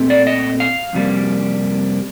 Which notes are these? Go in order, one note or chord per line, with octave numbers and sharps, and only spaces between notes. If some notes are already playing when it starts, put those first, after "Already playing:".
Already playing: A#2 A3 C4
D5
D#5
F5
F2 C3 G3 A#3